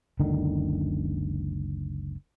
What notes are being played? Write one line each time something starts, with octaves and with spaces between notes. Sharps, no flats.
F#1 C#2 D3 D#3